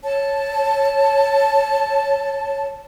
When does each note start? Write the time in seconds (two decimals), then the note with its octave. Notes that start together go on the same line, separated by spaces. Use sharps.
0.02 C#5 A5